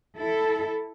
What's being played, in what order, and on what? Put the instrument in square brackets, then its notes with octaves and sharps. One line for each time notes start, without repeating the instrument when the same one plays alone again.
[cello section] E4 A4